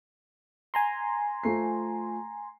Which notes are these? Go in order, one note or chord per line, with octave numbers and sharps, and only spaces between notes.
G#5 A#5 C6
F3 A3 C7